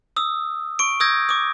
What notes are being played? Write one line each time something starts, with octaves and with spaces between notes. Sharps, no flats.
D#6 E6
C#6 D7
D#6 E6 G6 G#6 A#6
D6 D#6